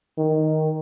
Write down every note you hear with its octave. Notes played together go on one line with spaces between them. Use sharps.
D#3